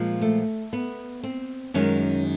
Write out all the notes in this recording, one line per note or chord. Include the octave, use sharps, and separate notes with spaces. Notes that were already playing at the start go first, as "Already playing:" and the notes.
Already playing: A#2 F3 G#3
A3
B3
C4
F#2 D#3 G#3 C#4